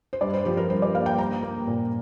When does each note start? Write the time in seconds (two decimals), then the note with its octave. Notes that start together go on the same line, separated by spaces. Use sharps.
0.13 C5
0.21 G2 D5
0.34 C5
0.45 F3 G4
0.57 A#4
0.70 G2 C5
0.82 D5
0.95 A#3 F5
1.06 G5
1.18 A#3 A#5
1.43 A#3
1.67 A#2